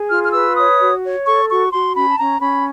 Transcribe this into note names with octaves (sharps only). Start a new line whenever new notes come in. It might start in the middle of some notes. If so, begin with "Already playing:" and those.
Already playing: G#4
F4 F6
F6
B4 E6
C#5 D#6
F#4
C#5
A4 C#6
F#4 C#6
F#4 C6
C#4 B5
A5
C#4 A#5
C#4 B5